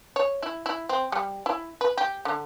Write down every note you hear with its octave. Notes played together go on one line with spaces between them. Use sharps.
C#5
E4
E4
C4
G3
E4
B4
G4
D3